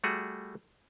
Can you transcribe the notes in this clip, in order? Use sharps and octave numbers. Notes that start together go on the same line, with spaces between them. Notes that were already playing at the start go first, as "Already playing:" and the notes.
G3 A3 F#4 G#4